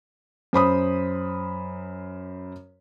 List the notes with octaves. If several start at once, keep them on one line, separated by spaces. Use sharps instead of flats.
F#2 C5 B5 D#6